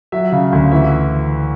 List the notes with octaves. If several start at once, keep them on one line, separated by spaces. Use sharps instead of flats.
F#3 E5
C#3 F5
D2
E3 E5